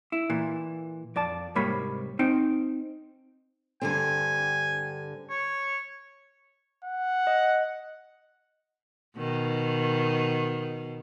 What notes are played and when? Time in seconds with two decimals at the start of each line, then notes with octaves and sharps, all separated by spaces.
0.12 E4
0.30 A#2 E3
1.16 F2 D5 A5
1.55 C2 G#2 G3 A#3 C#5 B5
2.19 C4 D#4 G5
3.81 G2 D3 C4 G#5
5.30 C#5
6.85 F#5
7.27 D#5
9.17 B2 D#3